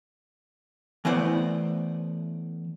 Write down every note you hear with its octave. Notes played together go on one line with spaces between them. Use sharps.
E3 A3 B3 E4 C5 D5